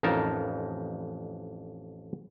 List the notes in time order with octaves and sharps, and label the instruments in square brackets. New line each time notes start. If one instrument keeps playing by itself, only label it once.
[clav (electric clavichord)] A1 F2 D#4 A#4 A5